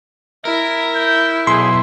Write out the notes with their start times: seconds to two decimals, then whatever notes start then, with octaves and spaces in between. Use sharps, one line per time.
0.45 E4 A#4
0.95 G6
1.47 B1 G#4 C6